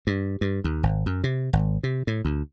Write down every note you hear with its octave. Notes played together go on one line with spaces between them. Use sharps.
G2
G2
D#2
G#1
F#2
C3
G#1
C3
A2
D2